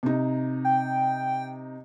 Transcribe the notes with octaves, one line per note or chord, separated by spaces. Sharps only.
C3 D#4
G5